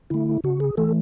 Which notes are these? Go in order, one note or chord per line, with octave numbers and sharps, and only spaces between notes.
D3 A3 E4
C#3 F#4
G#4
E3 A3 A4